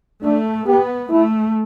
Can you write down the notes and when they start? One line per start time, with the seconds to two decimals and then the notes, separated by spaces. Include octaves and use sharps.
0.23 A3 D4
0.67 B3 G4
1.10 A3 E4